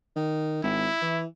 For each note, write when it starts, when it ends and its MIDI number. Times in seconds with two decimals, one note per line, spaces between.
0.16 0.59 51
0.63 0.88 32
0.63 1.23 64
1.02 1.25 52